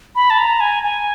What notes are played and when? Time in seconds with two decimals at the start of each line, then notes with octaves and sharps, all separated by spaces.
0.15 B5
0.30 A5
0.38 A#5
0.60 G#5
0.83 G#5